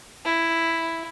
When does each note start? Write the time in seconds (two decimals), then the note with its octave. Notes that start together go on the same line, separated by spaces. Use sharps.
0.25 E4